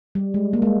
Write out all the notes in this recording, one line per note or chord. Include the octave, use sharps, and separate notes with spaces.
G3
G#3
A#3
G#3